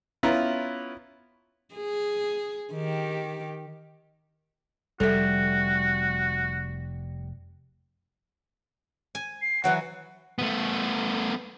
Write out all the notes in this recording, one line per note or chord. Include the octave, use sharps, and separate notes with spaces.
B3 C#4 E4 F4 A#5
G#4
D#3 G4
F1 G3 F#4 A4 E5
G#5
C7
E3 F#3 F#4 F#5
A3 B3